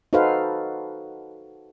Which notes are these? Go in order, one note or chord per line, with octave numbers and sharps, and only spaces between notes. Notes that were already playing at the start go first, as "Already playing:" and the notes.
D#4 F#4 A4 B4 C5 F5